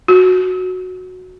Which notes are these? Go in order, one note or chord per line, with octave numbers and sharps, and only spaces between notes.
F#4